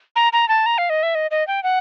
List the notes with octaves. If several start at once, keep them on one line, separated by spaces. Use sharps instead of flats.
A#5
A#5
A5
A#5
F5
D#5
E5
D#5
D#5
G5
F#5